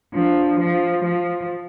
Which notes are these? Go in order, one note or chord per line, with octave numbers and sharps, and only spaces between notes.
F3 D4
F3
F3